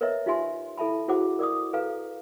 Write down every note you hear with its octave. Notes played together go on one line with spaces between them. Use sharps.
A#4 B4 C#5 D#5 E5 A#5
D#4 F4 G4 E5 G#5 C6
E4 A4 E5 A5 B5
E4 F#4 G#4 C5 F#5 D6
A#4 D5 D6 D#6
A4 B4 F5 A#5